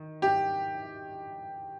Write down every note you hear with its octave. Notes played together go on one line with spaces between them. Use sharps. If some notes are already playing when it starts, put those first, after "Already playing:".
Already playing: D#3
G4